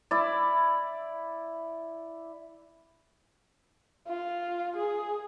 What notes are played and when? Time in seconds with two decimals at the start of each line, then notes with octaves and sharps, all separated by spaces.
0.11 E4 D5
4.08 F4
4.77 G#4